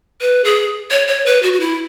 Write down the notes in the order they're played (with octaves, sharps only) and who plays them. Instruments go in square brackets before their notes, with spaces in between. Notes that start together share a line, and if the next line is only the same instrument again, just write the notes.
[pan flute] B4
G#4
C#5
C#5
B4
F#4
F#4
E4